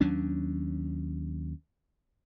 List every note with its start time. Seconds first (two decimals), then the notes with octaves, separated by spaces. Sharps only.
0.01 D#2 F#3 C#4 D4